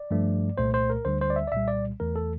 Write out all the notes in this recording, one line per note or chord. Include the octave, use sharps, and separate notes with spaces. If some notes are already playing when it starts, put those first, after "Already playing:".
Already playing: D5
G2 F3 A3
C2 A#2 A3 C5
C5
A#4
D2 D3 G3 C5
C5
D5
E5
D5
C2 A#2 G3 E5
D5
E2 E3 A3 A#4
A4